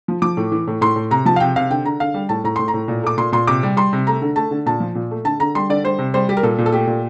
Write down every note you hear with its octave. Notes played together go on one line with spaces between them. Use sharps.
F3
F3 D6
A2
E3
A2
A2 C6
A2
C3 A#5
F3 A5
F5
C3 G5
C3 F5
D3 G5
D3 A#5
D3 F5
G3
A2 A5
A2 A#5
A2 C6
A#5
A2
A#2
A3 D6
A#2 C6
A#2 C6
C3 D6
G3
G3 C6
C3
A3 A#5
D3
A3 A5
D3
A#2 A5
F3
A#2
A3
D3 A5
D3 A#5
G3 C6
D3 D5
G3 C5
C3
G3 C5
G3 G4
A#4
A#2 A4
A#2
A4
A3 G4
A#2